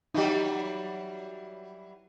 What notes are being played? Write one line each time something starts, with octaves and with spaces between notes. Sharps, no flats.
E3 F#3 G3 D#4 G4